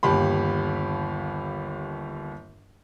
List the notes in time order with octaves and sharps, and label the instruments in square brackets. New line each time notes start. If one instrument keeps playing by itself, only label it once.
[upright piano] G1 D#2 G4 B5